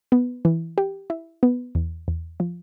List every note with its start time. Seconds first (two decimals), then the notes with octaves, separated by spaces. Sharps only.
0.12 B3
0.45 E3
0.78 G4
1.10 E4
1.43 B3
1.75 E2
2.08 E2
2.40 F3